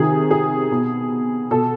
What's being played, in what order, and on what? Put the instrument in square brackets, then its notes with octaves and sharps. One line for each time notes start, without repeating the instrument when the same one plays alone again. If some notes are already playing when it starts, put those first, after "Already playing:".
Already playing: [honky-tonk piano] C3 D#3 G#4
G#4
B2
B2 A4